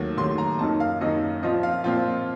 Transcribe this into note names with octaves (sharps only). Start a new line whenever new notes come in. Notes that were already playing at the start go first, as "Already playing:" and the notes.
Already playing: D#2 D#3 F#3 A3
D#2 D#3 F#3 A3 C6
A#5
F#2 D#3 A#3 D#4 A5
F5
F#2 D#3 A#3 D#4 D#5
A#2 F3 C4 F4 D#5
F5
A#2 F3 C4 F4